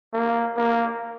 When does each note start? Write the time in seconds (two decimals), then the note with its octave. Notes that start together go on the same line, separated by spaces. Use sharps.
0.13 A#3
0.57 A#3